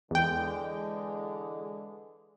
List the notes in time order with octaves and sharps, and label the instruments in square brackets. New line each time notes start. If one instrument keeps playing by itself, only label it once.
[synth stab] E2 G5 [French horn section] D3 E3 G#3